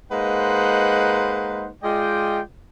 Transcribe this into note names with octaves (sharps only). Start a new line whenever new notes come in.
G#3 A#3 D#4 B4 C5 F#5
G#3 F4 D5 D#5 G5